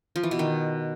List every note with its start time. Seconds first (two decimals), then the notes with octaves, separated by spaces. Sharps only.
0.16 F3
0.23 E3
0.31 B2
0.39 D#3